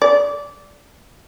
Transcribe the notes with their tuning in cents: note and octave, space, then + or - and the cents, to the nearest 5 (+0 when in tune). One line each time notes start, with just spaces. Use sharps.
D5 -15